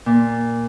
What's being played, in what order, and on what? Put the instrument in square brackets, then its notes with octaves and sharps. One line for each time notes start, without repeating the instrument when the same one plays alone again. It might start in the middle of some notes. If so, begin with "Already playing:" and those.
[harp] A#2